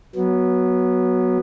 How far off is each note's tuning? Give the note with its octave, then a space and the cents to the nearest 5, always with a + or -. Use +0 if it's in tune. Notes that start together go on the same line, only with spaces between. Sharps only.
F#3 +0 B3 -15